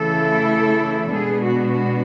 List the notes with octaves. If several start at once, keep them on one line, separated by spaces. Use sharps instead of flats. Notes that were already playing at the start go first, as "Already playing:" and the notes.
Already playing: C#3 E3 A3 E4 A4
B2 G#3 B3 D4 G#4
F#4
F#4